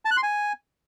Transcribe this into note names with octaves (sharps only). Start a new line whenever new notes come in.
A5
F#6
C6
G#5